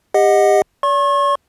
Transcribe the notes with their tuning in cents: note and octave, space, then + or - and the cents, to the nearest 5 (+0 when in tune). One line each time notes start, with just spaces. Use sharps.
G4 +35 D#5 +0 F#5 -10
D5 -45 C#6 -40